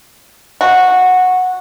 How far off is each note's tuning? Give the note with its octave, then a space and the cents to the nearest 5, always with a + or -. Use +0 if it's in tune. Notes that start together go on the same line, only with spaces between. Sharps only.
F#4 -10